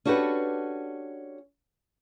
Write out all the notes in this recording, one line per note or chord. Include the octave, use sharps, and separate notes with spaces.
C#4 D4 F#4 G4 A4 B4